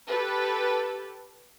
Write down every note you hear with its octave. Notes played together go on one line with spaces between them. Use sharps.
G4 A4 B4